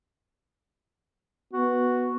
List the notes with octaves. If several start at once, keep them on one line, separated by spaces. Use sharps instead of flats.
B3 F#4